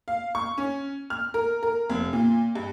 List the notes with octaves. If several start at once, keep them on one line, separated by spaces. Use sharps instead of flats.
F5
C#6
C#4
F6
A#4
A#4
F1
A#2
G2